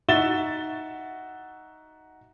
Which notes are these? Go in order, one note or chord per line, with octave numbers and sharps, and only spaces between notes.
D#4 F#4 E5 A6 E7 G7